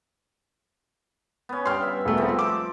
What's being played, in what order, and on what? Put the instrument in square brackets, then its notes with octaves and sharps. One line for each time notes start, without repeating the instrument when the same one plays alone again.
[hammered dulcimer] B3 C#4
[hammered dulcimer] G2 G5 [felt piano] C6 F6
[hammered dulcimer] E5
[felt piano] E1 A3
[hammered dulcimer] F3 C4
[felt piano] D6 E6